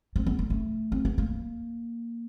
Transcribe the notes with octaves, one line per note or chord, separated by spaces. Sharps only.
C4
B3
A#3
A3
C4
B3
A#3